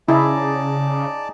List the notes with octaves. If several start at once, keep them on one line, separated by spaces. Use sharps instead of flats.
C#3 D#4 E4 G#4 D5 A5 A#5 D6